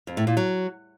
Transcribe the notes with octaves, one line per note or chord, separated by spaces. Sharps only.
F2
A2
A#2
F#3